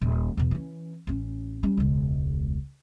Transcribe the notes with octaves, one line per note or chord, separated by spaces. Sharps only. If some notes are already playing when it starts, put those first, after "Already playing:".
D#1 A#2
E2 B2
E3 C#4
A1 C#4
G3 C#4
E1 C#2